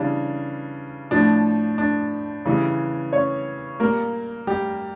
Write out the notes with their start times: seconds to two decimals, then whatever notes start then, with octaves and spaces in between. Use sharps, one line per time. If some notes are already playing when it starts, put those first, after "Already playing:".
Already playing: C#3 E3 G3 D4
1.11 A2 F3 D4
1.78 D4
2.45 C#3 E3 G3
3.13 C#4 C#5
3.80 A#2 G3 A#3 A#4
4.47 G3 G4